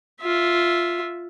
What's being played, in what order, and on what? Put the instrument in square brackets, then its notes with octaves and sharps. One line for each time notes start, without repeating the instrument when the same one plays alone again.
[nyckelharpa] F4 E5